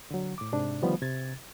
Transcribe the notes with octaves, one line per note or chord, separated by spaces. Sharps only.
D3 F#3
A2 D6
G#2 C3 D4
D3 D#3 F3 G3 A3 B3
C3 G#6 A6